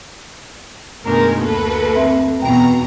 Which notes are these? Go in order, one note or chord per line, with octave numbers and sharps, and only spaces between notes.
F#2 B2 D#3 G#3 A3 D4 A#4
D2 A#3 A4 B4
C4 E5
E2 B2 B3 G5 A#5